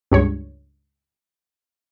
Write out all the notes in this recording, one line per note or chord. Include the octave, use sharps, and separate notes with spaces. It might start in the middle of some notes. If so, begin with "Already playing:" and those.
C#2 G2 C#5